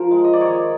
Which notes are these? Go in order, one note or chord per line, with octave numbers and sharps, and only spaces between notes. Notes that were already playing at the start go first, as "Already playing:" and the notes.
Already playing: F3 A#4 C5
G#3
D#5
D5
D#3 C#5